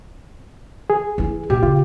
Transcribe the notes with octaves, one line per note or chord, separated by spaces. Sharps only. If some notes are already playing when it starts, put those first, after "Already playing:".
G#4
E3 E4
A#2 G4
C#3 F4